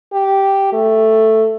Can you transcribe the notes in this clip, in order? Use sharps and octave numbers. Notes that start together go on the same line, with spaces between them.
G4
A3